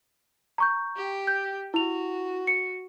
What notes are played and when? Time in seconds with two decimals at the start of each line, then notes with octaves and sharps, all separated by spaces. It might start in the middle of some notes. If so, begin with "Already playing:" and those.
0.58 A#5 C#6 G6
0.97 G4
1.27 G6
1.74 E4 F#4 F7
2.47 C#7